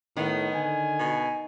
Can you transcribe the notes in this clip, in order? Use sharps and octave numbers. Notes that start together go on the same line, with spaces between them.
A2 D#3 B3
D3 G#5
B2